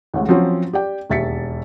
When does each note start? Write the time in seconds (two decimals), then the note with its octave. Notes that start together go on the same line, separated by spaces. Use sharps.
0.14 A1 D2 A2 G#3
0.29 F3 F#3 C4 C#4
0.73 G4 D5 G5
1.10 E1 D#2 E5 A6 B6 C#7